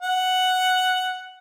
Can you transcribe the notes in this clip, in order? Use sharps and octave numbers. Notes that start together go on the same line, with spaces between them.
F#5